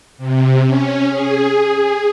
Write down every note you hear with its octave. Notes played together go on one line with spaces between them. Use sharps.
C3
C#4
G#4